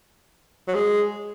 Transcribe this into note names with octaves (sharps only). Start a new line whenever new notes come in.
F#3
G#3